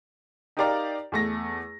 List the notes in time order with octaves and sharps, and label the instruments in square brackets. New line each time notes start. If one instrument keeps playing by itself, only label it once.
[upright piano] D#4 G4 A#4 D5 F5 A#5
E2 A3 A#6